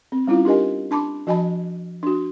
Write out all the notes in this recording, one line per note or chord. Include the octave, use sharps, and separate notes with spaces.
C4
G3 C#4 E4 F4 F5
D4 G4 A#4 D#5 G#5
D4 A5 B5 D6
F3 F#4 D#5 G#5 A5 B5
D4 F#4